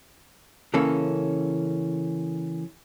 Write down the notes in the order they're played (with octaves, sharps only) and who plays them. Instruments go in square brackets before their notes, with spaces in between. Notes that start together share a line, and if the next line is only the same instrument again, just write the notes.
[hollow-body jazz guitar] C#3 E3 A#3 C#4 A4